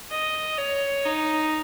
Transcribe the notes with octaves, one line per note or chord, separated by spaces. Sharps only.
D#5
C#5
D#4